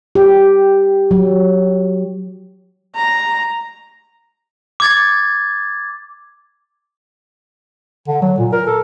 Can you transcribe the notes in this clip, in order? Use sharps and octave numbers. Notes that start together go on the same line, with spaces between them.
G4
F#3
A#5
D6 G#6 A6
D3
F#3
A#2
A#4
A4